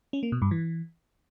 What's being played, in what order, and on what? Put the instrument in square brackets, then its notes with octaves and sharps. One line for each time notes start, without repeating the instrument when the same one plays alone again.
[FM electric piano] C#4
A#3
B2
G2
E3